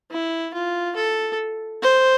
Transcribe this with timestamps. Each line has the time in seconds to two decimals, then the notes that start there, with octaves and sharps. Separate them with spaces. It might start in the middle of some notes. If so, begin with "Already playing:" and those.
0.11 E4
0.54 F4
0.96 A4
1.82 C5